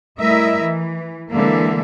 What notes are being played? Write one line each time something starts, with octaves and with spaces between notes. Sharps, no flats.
G3 A3 E4 A#4 D#5 E5
E3
D3 E3 G#3 A#3 E5